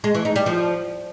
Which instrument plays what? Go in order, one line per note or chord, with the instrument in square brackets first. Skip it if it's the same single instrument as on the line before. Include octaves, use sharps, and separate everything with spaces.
[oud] G#3
E3
D#4
G3
F3